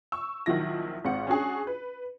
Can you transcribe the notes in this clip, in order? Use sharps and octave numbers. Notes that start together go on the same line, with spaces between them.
C#6 E6
A#1 D#3 F3 F#3 E4 A#6
G#1 G#2 C4 F4 F#5 C#7
C#4 D4 F#4 G#4
B4